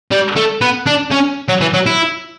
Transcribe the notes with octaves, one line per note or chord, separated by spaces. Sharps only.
G3
A3
B3
D4
C#4
F#3
E3
F#3
E4